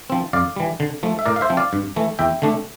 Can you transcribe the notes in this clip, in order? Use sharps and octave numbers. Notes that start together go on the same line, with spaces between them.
F3 C4
F2 D5 F5
E3 G3
D3
F3 A3
E5
A2 A#4 D5
F5
C5 E5
F3 C4
D5 F5
G2
E3 A3
E2 E5 G5
D3 A3 D4